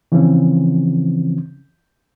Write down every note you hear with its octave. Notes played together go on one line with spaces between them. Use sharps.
C#3 E3 F3 C4 C#4